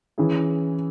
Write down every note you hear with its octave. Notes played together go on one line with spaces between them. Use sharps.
E3 C#4 E4 G#4